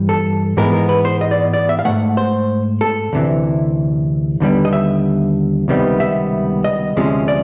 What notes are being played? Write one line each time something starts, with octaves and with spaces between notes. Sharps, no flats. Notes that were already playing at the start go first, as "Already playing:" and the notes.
Already playing: G2 E3 G3
A4
G#2 E3 G#3 B3 A#4
A#4
B4
C5
D#5
D5
D5
E5
F5
G#2 E3 A3 F#5
C5
A4
D2 C3 E3
D#2 D3 G3 B3
D#5
E5
C#2 C3 D#3 G3 B3
E5
D#5
D2 C3 F3 G#3 C#4
D5